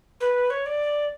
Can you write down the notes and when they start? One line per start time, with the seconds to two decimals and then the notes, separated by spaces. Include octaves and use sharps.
0.20 B4
0.50 C#5
0.66 D5